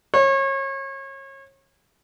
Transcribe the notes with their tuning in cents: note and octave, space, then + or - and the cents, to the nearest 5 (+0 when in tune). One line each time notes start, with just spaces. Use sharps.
C#5 -30